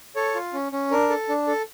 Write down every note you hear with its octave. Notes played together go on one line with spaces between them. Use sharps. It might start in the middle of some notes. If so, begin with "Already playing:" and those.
A4 C#5
F4
C#4
C#4
D4 A#4
A4
D4
A4